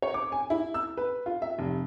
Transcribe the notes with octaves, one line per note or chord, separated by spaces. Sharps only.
C#5
D6
G#5
E4
E6
B4
F4
E5
F1